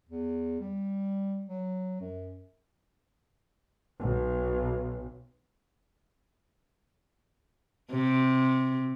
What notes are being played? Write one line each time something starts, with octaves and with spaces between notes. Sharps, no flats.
E2
G3
F#3
F#2
B1
C3